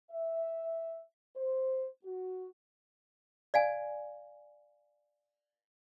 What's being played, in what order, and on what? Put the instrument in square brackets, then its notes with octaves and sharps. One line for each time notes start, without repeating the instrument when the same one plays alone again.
[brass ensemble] E5
C5
F#4
[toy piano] D5 F5 G#5